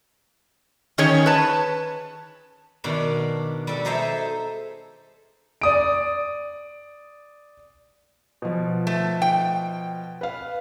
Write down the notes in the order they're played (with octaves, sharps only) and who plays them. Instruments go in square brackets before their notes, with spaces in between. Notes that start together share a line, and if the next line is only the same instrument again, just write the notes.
[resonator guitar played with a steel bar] D#3 C#4 G#4 C#5
B4 A5
[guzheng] B2 D#3 D4
G3 A4
D#4 G#4 A4 C5 D#5 E5
[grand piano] D5 D#6 D7
[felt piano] B2 F3
[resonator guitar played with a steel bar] A3
G5
[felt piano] B4 F5